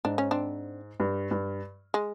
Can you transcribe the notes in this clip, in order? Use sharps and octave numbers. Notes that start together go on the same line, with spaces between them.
G#2 D4
C#4
C4 D4
G2
G2
G#3